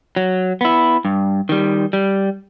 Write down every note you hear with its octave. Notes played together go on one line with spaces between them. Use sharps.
F#3
B3 E4
G2
D#3 G3
G3